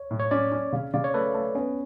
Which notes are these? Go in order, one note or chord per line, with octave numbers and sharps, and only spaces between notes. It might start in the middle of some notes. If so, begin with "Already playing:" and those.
Already playing: C#5
A2
C#5
C#4 D5
C#4
C#3
C#3 D5
C#5
A3 B4
A3
B3 C#4